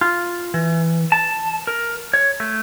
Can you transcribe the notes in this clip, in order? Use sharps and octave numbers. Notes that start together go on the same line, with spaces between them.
F4
E3
A5
A#4
C#5
A3